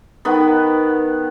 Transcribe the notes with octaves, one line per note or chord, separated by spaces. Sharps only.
D#3 B3